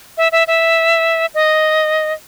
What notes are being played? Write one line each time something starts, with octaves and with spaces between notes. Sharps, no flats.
E5
E5
E5
D#5